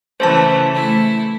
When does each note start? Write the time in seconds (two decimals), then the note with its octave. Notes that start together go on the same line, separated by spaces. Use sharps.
0.20 C#3 E3 A3 C5 A5
0.75 A3 E4